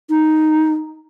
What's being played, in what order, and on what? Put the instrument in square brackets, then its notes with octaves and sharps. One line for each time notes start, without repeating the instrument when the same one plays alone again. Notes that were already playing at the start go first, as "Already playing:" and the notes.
[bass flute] D#4